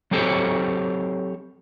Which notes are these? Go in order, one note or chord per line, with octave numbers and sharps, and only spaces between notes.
F#3 C4 G4 A4 C5 C#5